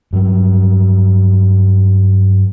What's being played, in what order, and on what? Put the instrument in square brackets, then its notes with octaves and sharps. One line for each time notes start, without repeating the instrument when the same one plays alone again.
[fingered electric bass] G2 F#3